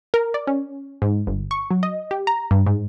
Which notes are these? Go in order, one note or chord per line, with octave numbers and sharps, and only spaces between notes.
A#4
D5
C#4
G#2
G1
C#6
F#3
D#5
G4
A#5
G2
G#2